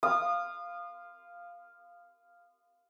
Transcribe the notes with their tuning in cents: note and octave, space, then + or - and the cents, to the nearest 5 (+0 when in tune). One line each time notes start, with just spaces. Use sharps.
F5 +0 D#6 -30